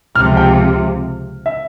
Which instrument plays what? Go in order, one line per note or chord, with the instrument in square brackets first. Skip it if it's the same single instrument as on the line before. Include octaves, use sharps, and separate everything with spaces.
[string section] C#2 C3 F3 [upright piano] F6
[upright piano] G5
E5